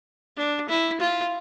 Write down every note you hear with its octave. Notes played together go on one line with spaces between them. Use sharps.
D4
E4
F4